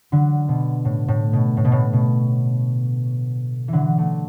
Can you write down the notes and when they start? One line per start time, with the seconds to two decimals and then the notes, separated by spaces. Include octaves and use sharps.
0.12 D3 F#3
0.48 B2
0.85 A2
1.08 A2
1.33 B2
1.57 A2
1.65 B2
1.72 A2
1.93 B2
3.68 D3 E3 F#3
3.98 F#3 A3